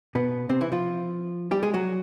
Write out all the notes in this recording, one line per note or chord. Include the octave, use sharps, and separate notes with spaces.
B2 B3
C3 C4
E3 E4
F3 F4
G3 G4
G#3 G#4
F#3 F#4